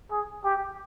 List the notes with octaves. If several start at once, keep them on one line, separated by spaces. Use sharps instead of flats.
G#4
G4